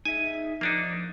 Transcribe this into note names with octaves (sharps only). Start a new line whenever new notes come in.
D#4 G#4 E5 G#5
F3 A#3 D4 D#4